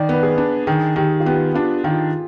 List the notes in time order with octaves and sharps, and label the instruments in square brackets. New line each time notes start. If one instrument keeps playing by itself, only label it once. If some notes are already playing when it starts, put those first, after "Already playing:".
Already playing: [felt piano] D#3 [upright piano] D5
[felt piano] B3 [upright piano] B4
[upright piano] G#4
[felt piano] D4
[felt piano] D#3 [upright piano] G#4
[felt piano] D#3 [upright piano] G4
[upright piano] F4
[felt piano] B3 [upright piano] G4
[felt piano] D4 [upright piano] F4
[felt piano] D#3 [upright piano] F4